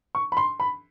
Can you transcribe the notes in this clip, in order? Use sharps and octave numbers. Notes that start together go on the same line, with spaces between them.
C#6
B5
C6
B5